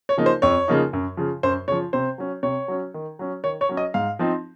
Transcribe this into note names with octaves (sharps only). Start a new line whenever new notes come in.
C#5
C#3 F3 A#3 D#4
C5
F2 C#5
C#3 F3 A#3 D#4
F#2
C#3 F3
F#2 C5
C#3 F3 C#5
C3 C5
F#3 C#4
C3 C#5
F#3 C#4
D#3
F#3 C#4
D#3 C#5
C#5
F#3 C#4
D#5
G#2 F5
F3 C4 D#4